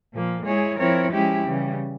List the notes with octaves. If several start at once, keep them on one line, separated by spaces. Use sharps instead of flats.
A#2 F3 A#3
G#3 E4 G#4 C#5
F3 C4 E4 A#4 C#5
F3 G#3 C#4 E4 G4
C#3 E3 G3